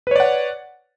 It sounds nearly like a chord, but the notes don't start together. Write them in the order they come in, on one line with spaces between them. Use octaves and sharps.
B4 C#5 D5 F#5